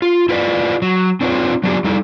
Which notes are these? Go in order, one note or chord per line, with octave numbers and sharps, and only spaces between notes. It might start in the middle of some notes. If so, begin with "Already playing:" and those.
F4
E4 F4 B4 D5 D#5
F#3
C4 D4 D#4 F4 B4 C#5
F#3 B3 D4 D#4 F4 G4
G3 D#4 E4 A4